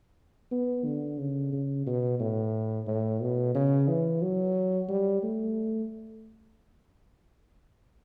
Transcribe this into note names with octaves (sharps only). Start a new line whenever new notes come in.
B3
D3
C#3
C#3
B2
A2
A2
B2
C#3
E3
F#3
G3
A3